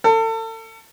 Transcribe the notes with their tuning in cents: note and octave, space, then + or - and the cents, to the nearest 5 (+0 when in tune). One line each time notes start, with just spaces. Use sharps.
A4 +35